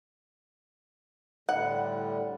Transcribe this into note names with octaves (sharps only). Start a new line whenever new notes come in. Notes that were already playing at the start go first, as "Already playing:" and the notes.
A2 D3 G3 F#5